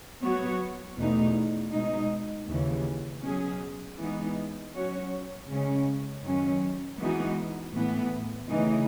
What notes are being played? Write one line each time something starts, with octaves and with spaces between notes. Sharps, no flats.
F#3 B3 F#4 C#5
E2 B2 A3 D#4
B2 G#3 D#4
D#2 C#3 E3
B2 F#3 C#4 G#4
E3 G#3 B3 D#4
F#3 C#4 F#4 C#5
C#3 G#3 C#4
F#2 D#3 F#3 C#4
E3 G#3 B3 D#4 F#4
A2 E3 B3
C#3 E3 A3 D#4